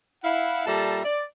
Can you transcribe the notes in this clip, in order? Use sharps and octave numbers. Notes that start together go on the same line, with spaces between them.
E4 F5 F#5
A#2 G3 A4 E5 A5 A#5
D5